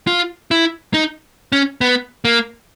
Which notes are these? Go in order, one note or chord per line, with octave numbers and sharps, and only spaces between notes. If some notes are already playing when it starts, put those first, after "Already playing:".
F4
E4
D#4
C#4
B3
A#3